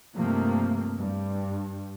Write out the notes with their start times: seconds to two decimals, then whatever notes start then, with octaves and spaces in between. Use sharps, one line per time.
0.15 G2 C3 F3 A3 A#3
0.97 G2